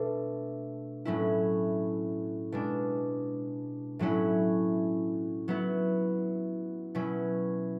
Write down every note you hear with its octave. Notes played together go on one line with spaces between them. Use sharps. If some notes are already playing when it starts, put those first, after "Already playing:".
Already playing: B2 A3 D4
A2 F#3 C#4 E4
B2 G#3 D4
A2 F#3 C#4 E4
F#3 B3 E4
B2 F#3 C#4 E4